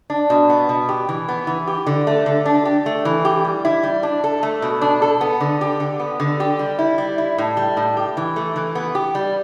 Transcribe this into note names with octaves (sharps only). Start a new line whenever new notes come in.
D4
B2
B3
B2
G4
E3
B3
E3
G4
D3
A3
D3
D4
G4
A3
E3
G4
G3
E4
G3
D4
A4
A3
B2
D4
A4
B3
D3
G4
D3
B3
D3
G4
G3
E4
G3
E4
A2
G3
A2
G4
E3
A3
E3
B3
G4
G3